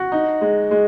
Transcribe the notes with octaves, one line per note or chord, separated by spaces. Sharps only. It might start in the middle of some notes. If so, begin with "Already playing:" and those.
Already playing: F#4
D#4
G#3
G#3